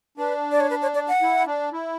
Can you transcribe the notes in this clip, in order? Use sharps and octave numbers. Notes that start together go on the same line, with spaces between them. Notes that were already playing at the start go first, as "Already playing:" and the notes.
D4 B4
D5
C#5
B4
C#5
D5
F#5
E4
D4
E4